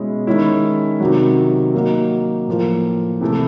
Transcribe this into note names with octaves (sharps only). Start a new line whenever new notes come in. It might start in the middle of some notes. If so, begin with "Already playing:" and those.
Already playing: B2 G#3 C#4 E4
D#3 G#3 C#4 E4
C3 D#3 F#3
F#3 A#3 D#4
A2 F3 A#3
C3 E3 A3